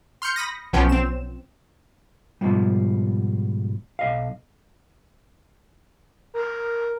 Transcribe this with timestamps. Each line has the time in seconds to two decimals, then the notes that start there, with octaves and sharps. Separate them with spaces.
0.22 C6 F6 G6 C#7
0.36 B5 D#6 A#6
0.73 B1 F3 B3 C#4 G5
0.89 C4 E7
2.41 G#2 B2 F3 G3
3.99 B1 D#5 F5
6.34 A#4